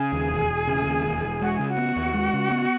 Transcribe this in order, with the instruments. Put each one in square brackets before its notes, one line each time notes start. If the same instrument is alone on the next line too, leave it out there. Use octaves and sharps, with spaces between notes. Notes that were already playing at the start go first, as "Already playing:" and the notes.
Already playing: [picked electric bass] C#3 [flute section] G#4
[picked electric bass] D#2
E1
E1
C#3
D#2
E1
E1
[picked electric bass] G#3 [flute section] F#4
[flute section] G#4
[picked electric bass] C#3
[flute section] F#4
[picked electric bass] B3
D#2
G#3
C#3
B3